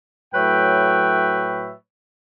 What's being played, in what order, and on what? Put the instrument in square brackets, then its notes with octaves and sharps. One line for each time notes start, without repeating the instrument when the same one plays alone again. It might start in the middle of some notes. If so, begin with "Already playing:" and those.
[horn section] A2 F#3 B4 C#5 E5 G5